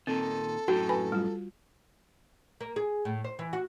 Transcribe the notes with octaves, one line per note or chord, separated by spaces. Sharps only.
A#2 D#3 C4 A4
F#2 A2 F#4 G5
B4 G#5 B5
G3 F4
A#3
G#4
A2
C5
E3
F#4